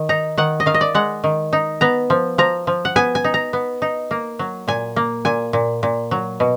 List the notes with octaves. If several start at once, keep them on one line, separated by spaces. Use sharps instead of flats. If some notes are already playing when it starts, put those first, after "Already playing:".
Already playing: D#3
D#4 A#5
D#3 F#5
D#5
D#3 F5
D#5
D5
G#3 F#5
D#3
D#4
B3 A#5
F3
F3 A#5
F3
F#5
B3 G#5
G#5
D#4
A#5
B3
D#4
A#3
F#3
A#2 G#5
A#3
A#2 G#5
A#2
A#2
F#3
B2